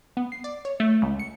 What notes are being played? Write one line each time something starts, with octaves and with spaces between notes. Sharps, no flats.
B3
C7
D5
C#5
A3
C#2
C#7